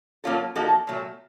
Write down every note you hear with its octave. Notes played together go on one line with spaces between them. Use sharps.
F#3 A#3 C#4 F4 A4
F3 A#3 D#4 F#4 A4
A#2 F#3 A3